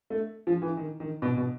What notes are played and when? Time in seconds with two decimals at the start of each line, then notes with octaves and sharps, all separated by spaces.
0.10 A3
0.47 F3
0.62 E3
0.77 D#3
1.00 D#3
1.22 B2
1.37 B2